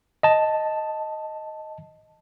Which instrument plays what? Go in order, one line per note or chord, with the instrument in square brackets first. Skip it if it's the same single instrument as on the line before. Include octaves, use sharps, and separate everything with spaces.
[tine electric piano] D#5 A5